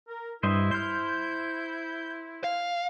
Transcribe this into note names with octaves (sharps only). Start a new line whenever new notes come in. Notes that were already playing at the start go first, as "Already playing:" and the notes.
A#4
G2 E4 C5 D#5 E5
C5 F6 G6
F5